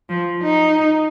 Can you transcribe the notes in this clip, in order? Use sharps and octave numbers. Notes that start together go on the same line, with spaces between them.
F3
D#4